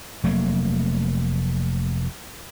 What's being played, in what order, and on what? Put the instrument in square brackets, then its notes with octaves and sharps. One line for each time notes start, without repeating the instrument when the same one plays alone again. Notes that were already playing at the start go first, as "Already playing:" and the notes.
[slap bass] F1 F#3 A3 A#3